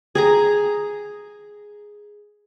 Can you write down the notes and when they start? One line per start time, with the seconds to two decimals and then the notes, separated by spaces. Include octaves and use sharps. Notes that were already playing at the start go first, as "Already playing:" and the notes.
0.15 G#4 G#5 A#5